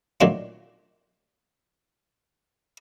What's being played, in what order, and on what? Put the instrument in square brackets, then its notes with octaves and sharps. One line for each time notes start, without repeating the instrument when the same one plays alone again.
[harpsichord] A#2 D#3 F#3 A3 D4 F4